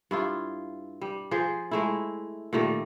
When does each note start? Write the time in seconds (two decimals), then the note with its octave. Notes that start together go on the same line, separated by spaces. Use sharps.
0.11 G2 E4 F4
1.01 G3
1.31 F3 G#4 C5
1.71 G#3 A3 E4
2.53 A#2 D#3 G3 A3